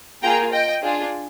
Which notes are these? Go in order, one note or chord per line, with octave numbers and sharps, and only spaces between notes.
A#3 F4 G#4 G5 A#5
D#5 G5
D4 F4 G#4